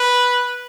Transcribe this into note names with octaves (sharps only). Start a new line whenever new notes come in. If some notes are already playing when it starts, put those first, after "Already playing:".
Already playing: B4